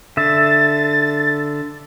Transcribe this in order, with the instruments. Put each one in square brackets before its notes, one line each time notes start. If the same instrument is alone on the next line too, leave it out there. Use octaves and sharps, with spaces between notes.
[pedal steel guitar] D3 E5 [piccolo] A6